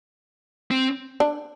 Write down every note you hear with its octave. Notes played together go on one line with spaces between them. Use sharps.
C4
D4